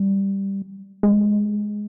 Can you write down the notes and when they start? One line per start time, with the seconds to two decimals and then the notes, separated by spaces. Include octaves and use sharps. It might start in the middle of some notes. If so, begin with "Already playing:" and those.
Already playing: G3
1.03 G#3